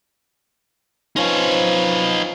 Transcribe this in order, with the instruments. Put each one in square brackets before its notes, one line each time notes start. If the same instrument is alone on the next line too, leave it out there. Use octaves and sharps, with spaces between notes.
[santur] F3 C#4 C5 [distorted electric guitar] D#4 B4